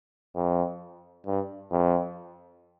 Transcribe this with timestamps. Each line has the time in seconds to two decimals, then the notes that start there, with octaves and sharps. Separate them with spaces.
0.36 F2
1.26 G2
1.71 F2